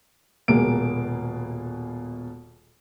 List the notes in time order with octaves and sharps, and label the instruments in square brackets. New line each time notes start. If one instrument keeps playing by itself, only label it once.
[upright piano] D#1 B2 G#3 A#3 D7